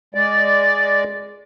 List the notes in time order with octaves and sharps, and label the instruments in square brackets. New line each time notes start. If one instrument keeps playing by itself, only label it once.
[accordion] G#3 D5